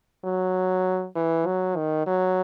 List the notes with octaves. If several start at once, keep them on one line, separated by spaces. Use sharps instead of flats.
F#3
E3
F#3
D#3
F#3